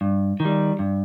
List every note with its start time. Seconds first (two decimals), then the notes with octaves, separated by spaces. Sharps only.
0.01 G2
0.40 D#3
0.45 G3
0.79 G2